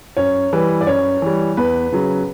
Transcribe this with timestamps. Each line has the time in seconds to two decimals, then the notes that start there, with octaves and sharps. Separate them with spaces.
0.17 F#2 C#5
0.53 E3 G3 B4
0.81 D5
0.87 F#2 C#5
1.22 E3 G3
1.57 E2 B4
1.92 C#3 F#3